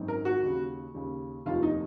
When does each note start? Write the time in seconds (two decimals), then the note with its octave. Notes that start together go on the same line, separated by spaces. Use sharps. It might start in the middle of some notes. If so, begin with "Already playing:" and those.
Already playing: G#1 F#2 D#3
0.08 A#4
0.25 F#4
0.43 D#2 C#3
0.94 D#2 C#3
1.46 F1 D#2 D#3 F4
1.63 D#4